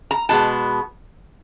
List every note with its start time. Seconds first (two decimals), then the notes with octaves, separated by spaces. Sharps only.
0.11 A#5
0.29 B2 G#3 B3 A5